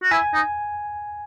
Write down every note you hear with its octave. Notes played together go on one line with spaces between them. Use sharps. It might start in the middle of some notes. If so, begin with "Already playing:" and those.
F#4
E4 G#5
D#4